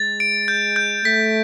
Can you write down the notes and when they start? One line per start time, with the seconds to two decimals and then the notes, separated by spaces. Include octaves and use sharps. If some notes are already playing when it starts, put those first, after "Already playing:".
Already playing: G#3 A6
0.20 D7
0.48 G6
0.76 G6
1.05 A3 B6